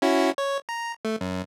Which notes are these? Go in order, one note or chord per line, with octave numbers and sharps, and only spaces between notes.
C#4 E4 F#4
C#5
A#5
A3
F#2